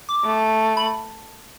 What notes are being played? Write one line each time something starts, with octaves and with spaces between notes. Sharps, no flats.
D6
A3
B5